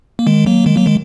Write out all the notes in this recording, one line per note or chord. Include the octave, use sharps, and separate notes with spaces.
A#3
D#3 G#3
F#3 A#3
D#3 G#3
F#3 A#3
D#3 G#3